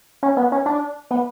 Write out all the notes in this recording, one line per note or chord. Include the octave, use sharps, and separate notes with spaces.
C#4
B3
C#4
D4
B3